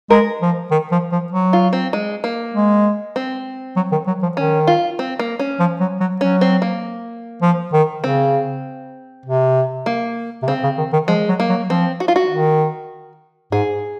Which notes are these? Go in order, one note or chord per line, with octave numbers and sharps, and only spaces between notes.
G#3 A#4
F3
D#3
F3
F3
F#3
F4
C4
G#3
A#3
G#3
C4
F#3
D#3
F#3
F3
D#3 C#4
F4
C4
A#3
C#4
F3
F#3
F#3
F#3 C#4
C4
A#3
F3
D#3
C#3 C4
C3
A#3
C3
C#3 C4
C#3
D#3
D#3
F3 G#3
F#3
A#3
F#3
F3 C4
F#4
F4
F#4
D#3
G#2 G#4